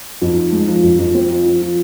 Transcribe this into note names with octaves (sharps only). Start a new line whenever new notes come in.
F2
D#4
G#3
F3
F2
F2
C4
F4
F3
F3